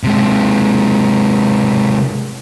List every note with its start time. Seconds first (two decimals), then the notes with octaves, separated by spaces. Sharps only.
0.04 C3 G#3